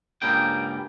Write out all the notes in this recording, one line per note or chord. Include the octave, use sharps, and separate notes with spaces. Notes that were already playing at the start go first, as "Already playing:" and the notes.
C#2 G2 G3 A#3 G#4 G5